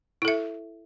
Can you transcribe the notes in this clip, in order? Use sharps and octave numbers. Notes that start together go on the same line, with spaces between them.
E4 A4 E5